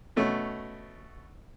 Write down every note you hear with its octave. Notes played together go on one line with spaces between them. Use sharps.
B2 A3 C#4